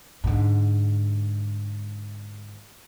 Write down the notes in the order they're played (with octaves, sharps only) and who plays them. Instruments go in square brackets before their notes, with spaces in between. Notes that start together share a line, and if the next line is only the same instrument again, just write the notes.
[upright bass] G#2 D3